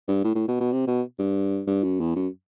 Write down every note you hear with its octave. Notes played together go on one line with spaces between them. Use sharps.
G2
A2
A2
B2
B2
C3
B2
G2
G2
F#2
E2
F#2